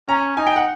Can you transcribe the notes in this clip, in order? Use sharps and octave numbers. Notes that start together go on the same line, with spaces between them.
C#4 A#5
D#4 G#5
G5
F#5